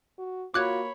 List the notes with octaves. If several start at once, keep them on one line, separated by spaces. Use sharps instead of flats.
F#4
A#3 F4 F#4 C#5 B5 D6 F#6 G#6